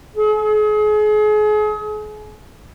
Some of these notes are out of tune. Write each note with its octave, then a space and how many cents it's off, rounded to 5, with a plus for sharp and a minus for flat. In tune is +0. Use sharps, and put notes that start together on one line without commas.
G#4 +35